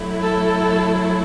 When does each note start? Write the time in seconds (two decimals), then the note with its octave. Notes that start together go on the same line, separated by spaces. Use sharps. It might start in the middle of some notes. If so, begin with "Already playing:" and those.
Already playing: F#3 A3 E4
0.22 A4